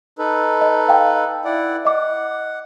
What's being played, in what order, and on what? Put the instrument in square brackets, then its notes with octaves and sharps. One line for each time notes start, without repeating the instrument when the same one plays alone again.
[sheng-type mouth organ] D#4 A4 B4
[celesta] D#5
F5 G5
[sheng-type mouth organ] E4 D5 F#5
[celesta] D#5 D6 [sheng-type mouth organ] F#5